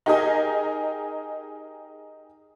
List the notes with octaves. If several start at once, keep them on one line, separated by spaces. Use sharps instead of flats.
D#4 G4 G#4 A#4 D#5 G#5